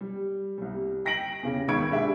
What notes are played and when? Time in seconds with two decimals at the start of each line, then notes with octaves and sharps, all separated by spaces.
0.01 G3
0.58 C2 G3
1.05 G5 A#6 B6 D7 F#7
1.43 E2 C#3
1.68 C#2 D#3 B5 C#6 G#6 D7
1.90 G#3 D4 G4 E5